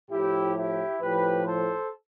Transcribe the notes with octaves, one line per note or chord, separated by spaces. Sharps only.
A2 F3 E4 G4
E4 G4
A2 F3 G4 B4
A4 C5